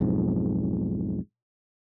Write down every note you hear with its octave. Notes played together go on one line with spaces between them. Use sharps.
B1 F2 G#2